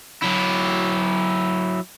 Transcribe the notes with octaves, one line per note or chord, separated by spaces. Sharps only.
F#3 E4